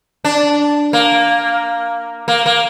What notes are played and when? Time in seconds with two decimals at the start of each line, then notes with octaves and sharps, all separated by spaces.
0.25 D4
0.93 A#3
2.28 A#3
2.46 A#3